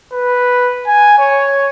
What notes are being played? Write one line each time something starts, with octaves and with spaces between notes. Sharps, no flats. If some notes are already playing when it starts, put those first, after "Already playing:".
B4
G#5
C#5